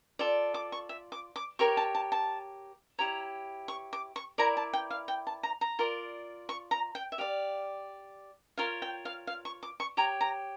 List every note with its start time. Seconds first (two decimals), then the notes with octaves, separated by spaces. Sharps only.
0.19 F4 A4 D5
0.54 D6
0.72 C#6
0.89 E5
1.12 D6
1.36 D6
1.59 G4 A#4 C#5 C#6
1.77 A5
1.95 A5
2.12 A5
2.99 E4 G4 C#5 A#5
3.68 C#6
3.93 D6
4.16 C#6
4.38 E4 A#4 D5 A#5
4.57 A5
4.73 G5
4.91 F5
5.08 G5
5.27 A5
5.43 A#5
5.61 A#5
5.79 F4 A#4 D5
6.49 C#6
6.71 A#5
6.95 G5
7.12 E5
7.18 G4 D5 F5
8.57 F4 A#4 C#5 F5
8.82 G5
9.05 F5
9.27 F5
9.45 C#6
9.63 D6
9.80 C#6
9.97 G4 C#5 A#5
10.21 A#5